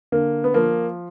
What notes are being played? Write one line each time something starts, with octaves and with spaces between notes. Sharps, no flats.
D3 A#3
B3
F3 A#3